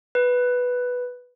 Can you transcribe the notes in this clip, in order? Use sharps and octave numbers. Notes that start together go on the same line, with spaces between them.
B4